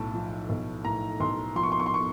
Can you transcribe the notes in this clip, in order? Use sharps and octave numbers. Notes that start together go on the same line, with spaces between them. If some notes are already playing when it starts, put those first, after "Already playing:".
Already playing: B1 A2 A5
F3
B1
A2 A#5
B1 C6
F3 C6
C#6
C6
C#6
C6
C#6